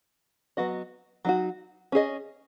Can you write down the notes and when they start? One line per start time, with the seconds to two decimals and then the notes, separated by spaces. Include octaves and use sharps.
0.57 F#3 B3 F#4 D#5
1.25 F#3 D#4 F#4
1.92 C#4 G#4 D#5